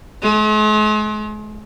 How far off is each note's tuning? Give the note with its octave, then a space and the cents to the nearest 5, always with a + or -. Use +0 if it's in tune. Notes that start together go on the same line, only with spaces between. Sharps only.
G#3 +45